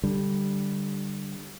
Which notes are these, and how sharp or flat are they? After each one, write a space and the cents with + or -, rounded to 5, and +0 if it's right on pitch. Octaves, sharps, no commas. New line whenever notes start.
D3 +0 G3 +0